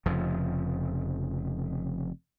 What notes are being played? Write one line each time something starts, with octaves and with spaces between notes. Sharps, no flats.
F1 F2 C#3 F3